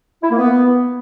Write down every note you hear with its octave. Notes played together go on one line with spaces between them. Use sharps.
E4
A#3
B3